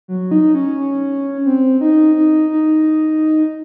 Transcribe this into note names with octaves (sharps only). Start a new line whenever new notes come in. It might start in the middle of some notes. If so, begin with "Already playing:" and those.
F#3
D#4
C#4
C4
D#4
D#4
D#4